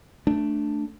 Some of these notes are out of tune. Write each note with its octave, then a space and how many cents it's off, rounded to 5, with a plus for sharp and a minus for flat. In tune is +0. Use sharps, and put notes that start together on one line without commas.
A3 +0 D4 +0